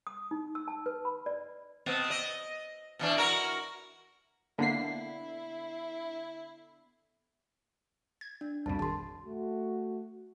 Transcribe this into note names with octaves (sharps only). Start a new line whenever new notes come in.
D#6
D#4
E6
A5
B4
B5
D5
B2 B3 C4
D#5
B2 E3 D4
E4 F#4 A#4
D3 A#3 B3 D4 E4 B6 C7
G#6
D4
C2 F2 B2 A5
G#1 A5 C6
A3 F#4